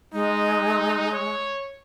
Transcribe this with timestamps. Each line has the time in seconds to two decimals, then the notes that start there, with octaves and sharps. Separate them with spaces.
0.13 G#3 D#4
1.12 C#5